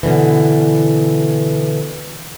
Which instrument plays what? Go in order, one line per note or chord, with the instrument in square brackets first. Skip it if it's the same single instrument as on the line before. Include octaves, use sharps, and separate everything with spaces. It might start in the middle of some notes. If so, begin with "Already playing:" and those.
[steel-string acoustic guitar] B2 D3 E3